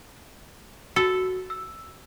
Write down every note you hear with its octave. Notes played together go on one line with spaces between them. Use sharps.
F#4 A4
E6